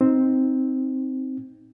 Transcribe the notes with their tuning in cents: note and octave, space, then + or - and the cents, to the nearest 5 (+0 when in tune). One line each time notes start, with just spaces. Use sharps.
C4 +0 D#4 +10